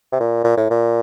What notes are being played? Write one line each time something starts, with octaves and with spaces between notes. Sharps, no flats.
C3
A#2
A#2
A2
A#2